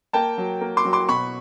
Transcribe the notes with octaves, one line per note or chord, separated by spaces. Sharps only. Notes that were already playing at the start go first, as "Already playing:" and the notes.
A#3 G5 A5
F#3
A#3
C6 D6
F#3
C6 D6
B2 B5 C#6